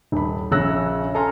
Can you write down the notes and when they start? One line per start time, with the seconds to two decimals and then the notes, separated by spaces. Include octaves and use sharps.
0.12 D#1 B5
0.51 A#1 C#3 C#5 E6 F#6 A#6
1.15 A4 G#5 A#5 C6 F6